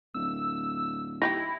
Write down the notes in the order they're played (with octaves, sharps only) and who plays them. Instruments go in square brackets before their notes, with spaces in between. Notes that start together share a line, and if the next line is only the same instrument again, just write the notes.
[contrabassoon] D1 [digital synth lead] E6
[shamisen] D#4 F#4 G4 [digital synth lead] E4 [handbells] A#6